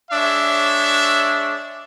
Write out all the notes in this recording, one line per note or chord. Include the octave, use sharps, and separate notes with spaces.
G#3 D4 C#5 E5